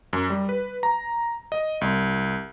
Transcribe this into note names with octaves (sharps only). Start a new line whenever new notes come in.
F#2
G3
B4
A#5
D#5
C2